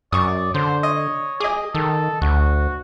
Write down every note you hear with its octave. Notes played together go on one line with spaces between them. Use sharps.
F#2 D5 C#6 D#6
D3 C5
C#5 D#5
G#4 D#5 D6
D#3 A4
D2 F#4